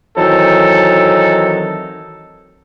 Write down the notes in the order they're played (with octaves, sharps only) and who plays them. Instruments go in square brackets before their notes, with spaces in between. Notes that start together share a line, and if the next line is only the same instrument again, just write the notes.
[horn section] D#3 E3 F#3 C4 D#4 A4